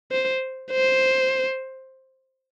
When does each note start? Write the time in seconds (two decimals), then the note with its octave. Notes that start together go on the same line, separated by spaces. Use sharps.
0.11 C5
0.72 C5